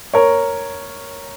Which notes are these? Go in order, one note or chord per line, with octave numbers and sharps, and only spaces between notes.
A#4 C#5